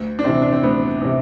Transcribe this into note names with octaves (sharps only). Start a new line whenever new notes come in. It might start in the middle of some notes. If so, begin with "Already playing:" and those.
Already playing: D2
D4
C3 E3 C4
D4
C4
D2 B3
C3 E3